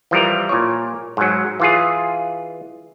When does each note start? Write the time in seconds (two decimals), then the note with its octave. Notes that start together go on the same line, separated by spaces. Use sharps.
0.11 E3 F3 G3 A#4
0.49 A#2 C#5
1.17 G#2 F#3
1.60 E3 F4 G#4